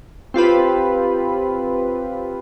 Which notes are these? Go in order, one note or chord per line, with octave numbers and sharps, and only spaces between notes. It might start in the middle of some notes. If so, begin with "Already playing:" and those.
C4 F4 G4 B4